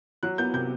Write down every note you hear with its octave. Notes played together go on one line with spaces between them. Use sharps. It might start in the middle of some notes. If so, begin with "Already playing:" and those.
F#3 F#6
B3 G6
C3 G6